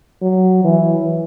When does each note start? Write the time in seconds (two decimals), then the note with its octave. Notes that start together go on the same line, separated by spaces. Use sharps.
0.22 F#3
0.64 E3